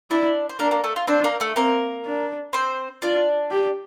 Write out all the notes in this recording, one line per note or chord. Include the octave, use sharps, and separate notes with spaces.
D4 E4 D5
C5
A#3 D4 A#4
A#3 A#4
A3 A4
F4
C4 D4 C5
A#3 A#4
A3 A4
A#3 C4 A#4
D4
C4 C5
D4 F4 D5
G4